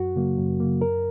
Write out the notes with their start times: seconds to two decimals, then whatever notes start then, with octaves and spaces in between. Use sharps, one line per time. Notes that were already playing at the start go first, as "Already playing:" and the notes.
Already playing: F#2 F#4
0.15 C#3 F#3 A#3
0.37 F#2
0.60 C#3 F#3 A#3
0.81 F#2 A#4